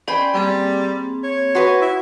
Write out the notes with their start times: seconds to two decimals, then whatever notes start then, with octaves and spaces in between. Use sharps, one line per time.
0.08 C#4 C5 D5 G5 G#5 B5
0.34 G3 A#3 C4 G#4
1.23 C#5
1.55 F#4 B4 E5 B5 C6 D#6
1.81 E4